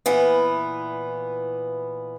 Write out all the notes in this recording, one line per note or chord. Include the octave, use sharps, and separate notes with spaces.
A#2 E3 B3